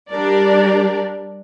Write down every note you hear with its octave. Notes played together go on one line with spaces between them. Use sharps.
G3 D4 G4 A#4 D5